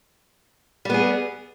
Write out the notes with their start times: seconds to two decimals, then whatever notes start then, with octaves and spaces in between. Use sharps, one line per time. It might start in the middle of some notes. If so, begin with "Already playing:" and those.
0.85 G3
0.90 B3
0.94 G#4